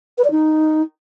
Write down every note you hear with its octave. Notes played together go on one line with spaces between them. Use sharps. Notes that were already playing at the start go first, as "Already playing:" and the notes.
B4
D5
D#4